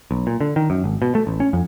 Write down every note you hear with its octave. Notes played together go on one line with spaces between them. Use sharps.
B1
A#2
D3
D#3
F#2
G#1
B2
A3
A1
C#4
F2